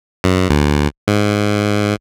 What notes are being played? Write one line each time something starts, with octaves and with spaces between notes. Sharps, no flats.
F#2
D2
G#2